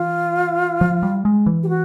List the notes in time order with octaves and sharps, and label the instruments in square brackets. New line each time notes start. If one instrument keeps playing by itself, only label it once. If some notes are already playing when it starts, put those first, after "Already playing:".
Already playing: [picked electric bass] E3 [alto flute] F4
[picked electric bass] F3
G3
G#3
E3
[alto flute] G4
F#4